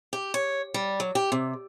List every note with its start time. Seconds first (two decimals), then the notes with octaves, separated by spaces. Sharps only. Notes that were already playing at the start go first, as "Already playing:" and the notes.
0.13 G4
0.34 C#5
0.74 G3
1.00 F#3
1.15 G4
1.32 C3